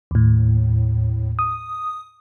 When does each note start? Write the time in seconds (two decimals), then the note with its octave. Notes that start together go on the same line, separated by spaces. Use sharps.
0.11 D#2 A2
1.39 D#6